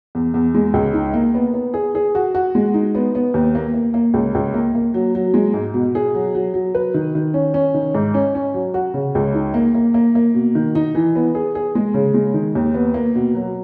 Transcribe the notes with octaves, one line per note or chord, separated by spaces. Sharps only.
E2
E2
G#3
C#2
D#4
A#3
B3
B3
G#4
G#4
F#4
F#4
G#3
D#4
B3
B3
D#2
A#3
A#3
A#3
C#2
C#2
A#3
A#3
F#3
F#3
G#3
G#2
B2
G#4
F#3
F#3
F#3
B4
D#3
D#3
C#4
C#4
D#3
G#2
C#4
C#4
F#3
F#4
C#3
C#2
D#4
A#3
A#3
A#3
A#3
B2
D#3
D#4
E3
B3
G#4
G#4
G#3
C#3
G#3
D#3
D#2
B3
A#3
B2
F#3